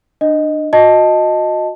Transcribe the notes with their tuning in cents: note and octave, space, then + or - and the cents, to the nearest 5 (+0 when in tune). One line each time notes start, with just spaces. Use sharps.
D4 +30 D#5 +0
F#4 -35 D#5 +0 A5 +0